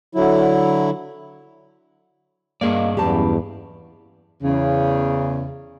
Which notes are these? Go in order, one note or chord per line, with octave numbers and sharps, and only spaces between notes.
D3 F#3 E4
G2 A#3 G#4 A#4 D5 D#5 F5
E2 F#3 C#4 G4 A5 B5
E2 C#3